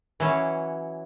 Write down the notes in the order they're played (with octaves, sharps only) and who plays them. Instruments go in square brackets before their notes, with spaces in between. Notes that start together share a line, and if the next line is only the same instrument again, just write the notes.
[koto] E3 F#3 C#4